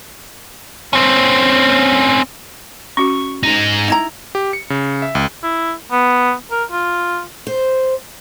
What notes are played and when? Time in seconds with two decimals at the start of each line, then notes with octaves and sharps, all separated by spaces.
0.93 C4 C#4
2.97 C#4 F#4 C#6
3.43 G#3 D#4 A#6
3.88 D#4 E4 A#5
4.35 G4
4.53 C#7
4.70 C#3
5.02 E5
5.15 C#2
5.43 E4
5.92 B3
6.51 A#4
6.72 F4
7.47 C5